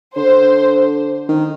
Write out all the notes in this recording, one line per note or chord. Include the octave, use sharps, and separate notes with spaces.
D3 C5
D#3